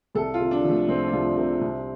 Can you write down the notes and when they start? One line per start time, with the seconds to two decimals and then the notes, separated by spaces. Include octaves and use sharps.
0.15 C2 A4
0.34 F4
0.40 C3
0.51 D4
0.64 F3
0.69 A3
0.88 C2 C4
1.08 D4
1.13 C2 F4
1.37 C3 C4
1.61 C2